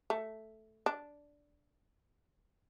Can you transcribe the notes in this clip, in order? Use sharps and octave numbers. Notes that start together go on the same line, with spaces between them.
A3
D4